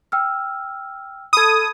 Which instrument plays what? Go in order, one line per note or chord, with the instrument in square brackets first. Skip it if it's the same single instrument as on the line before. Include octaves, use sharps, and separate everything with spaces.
[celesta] G5 E6 F6
[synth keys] A4 D#6 [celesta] B5 G#6